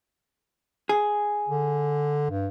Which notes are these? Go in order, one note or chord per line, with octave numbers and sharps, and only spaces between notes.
G#4
D3
G2